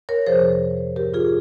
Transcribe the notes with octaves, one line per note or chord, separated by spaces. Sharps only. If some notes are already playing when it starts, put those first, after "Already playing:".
A#4 C#5
F2 C3 F3 G#4 C5
G#2 F3 G4 A#4
F4 G#4